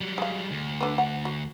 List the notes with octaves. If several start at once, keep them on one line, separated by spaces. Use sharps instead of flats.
F#3 G3
G#3 F5
D2
D3 B3
F#5
F#4